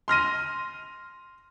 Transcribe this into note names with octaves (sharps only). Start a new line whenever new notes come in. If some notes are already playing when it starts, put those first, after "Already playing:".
C6 F6 A#6 D#7